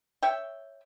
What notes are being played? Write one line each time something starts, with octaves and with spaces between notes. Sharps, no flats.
C#5 E5 G5